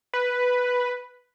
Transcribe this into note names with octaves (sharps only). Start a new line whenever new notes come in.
B4